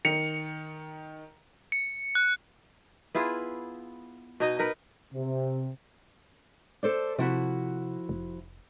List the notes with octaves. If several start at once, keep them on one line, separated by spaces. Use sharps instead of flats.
D#3 C#7 F7
C#7
F#6
B3 E4 F4 G#4
B2 D#4 D#5
D#4 A#4 B4
C3
A4 C5 D5
C3 F3 E4 F#4
F1